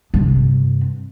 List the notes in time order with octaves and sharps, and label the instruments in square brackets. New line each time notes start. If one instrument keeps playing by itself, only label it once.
[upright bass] G2 C3